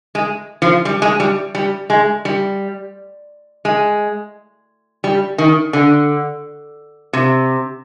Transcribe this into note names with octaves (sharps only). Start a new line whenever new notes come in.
G#3
F3
G3
G#3
G3
G3
G#3
G3
G#3
G3
D#3
D3
C3